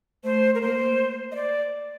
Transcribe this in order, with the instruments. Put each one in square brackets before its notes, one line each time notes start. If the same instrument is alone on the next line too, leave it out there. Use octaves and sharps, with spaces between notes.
[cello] A3 [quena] C5
[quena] A#4
[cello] A#3 [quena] C5
[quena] D#5
D5